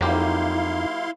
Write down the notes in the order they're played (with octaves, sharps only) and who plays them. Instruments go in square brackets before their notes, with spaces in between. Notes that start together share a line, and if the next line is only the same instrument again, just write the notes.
[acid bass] F2 [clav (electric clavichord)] F#3 A#3 G4 [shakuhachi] D#4 [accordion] E4 F5 C6